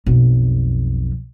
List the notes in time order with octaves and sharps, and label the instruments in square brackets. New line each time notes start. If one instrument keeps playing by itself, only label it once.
[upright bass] B1 F2